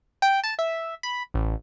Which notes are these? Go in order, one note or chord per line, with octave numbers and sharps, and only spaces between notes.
G5
A5
E5
B5
A1